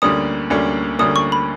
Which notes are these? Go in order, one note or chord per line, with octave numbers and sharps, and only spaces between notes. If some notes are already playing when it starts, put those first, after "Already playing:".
D2 D3 G3 A#3 C#4 D#6
D2 D3 G3 A#3 C#4
D2 D3 G3 A#3 C#4 D#6
C#6
B5